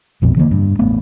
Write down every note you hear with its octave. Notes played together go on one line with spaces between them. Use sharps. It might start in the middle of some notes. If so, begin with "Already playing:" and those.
A#1 F2 B2
D3 E3 G#3 A#3
G2
A1 A3 B3